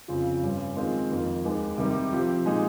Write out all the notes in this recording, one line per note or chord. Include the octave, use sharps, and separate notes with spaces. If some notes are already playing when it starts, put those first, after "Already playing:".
F2 C#3 F3 C4
G2 G3 C#4
D#3 G#3 C4 F4
F2 D#3 A#3
D#2 D#3 G#3
C3 D#3 G3
F3 C4 G4
A#2 G#3 D#4